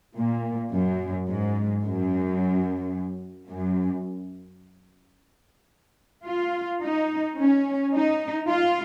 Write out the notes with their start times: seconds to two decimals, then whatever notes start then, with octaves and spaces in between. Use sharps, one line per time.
0.17 A#2
0.72 F#2
1.29 G#2
1.83 F#2
3.49 F#2
6.26 F4
6.82 D#4
7.37 C#4
7.93 D#4
8.48 F4